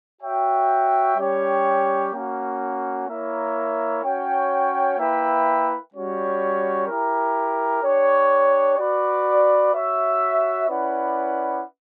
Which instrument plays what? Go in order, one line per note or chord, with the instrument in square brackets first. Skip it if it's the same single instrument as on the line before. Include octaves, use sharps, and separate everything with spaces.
[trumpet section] F#4 C#5 E5 G5
G3 C#4 G4 C#5 G5
A#3 C#4 F#4
A#3 E4 A#4 C#5 E5
C#4 F#4 C#5 G5
A#3 E4 B4 E5 G5
G3 C#4 F#4 C#5
E4 G4 A#4
D4 G4 C#5
F#4 B4 D5
F#4 C#5 E5
C#4 E4 B4 D5 F#5